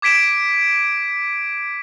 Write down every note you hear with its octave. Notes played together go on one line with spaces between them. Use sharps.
D6 G#6 B6 D7 E7